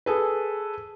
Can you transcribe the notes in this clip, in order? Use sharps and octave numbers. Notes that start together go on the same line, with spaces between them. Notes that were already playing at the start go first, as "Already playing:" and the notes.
G#4 A4 B4